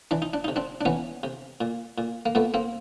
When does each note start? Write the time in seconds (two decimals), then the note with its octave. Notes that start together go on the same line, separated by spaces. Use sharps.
0.11 E3 D4
0.22 D#4
0.33 D4
0.44 C3 D#4
0.56 C4 D4
0.81 D4
0.85 E3 B3 C#4
1.23 C3
1.61 A#2
1.98 A#2
2.26 A#3
2.35 A#2 A3 B3
2.54 A#3 C4